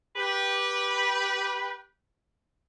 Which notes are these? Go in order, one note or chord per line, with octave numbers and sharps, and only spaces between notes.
G4 B4